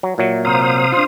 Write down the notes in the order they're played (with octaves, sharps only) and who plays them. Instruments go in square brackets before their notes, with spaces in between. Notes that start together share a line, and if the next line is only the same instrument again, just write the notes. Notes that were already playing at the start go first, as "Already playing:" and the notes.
[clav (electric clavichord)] F#3
[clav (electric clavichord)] A#2 F#3 [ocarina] E5
[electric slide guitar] C3 C4 [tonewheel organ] C5 F5 D#6 [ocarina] A#5
[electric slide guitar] D4 F4 [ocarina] C6